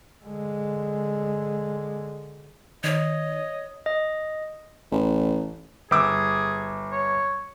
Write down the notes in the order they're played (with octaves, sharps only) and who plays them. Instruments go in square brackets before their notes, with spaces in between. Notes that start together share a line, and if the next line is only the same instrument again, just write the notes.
[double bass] D3 G#3
[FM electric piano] D#3 [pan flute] C#5 [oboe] D#5
[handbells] D#5
[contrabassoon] A1
[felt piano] G1 D6 E6 [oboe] G#4
[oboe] C#5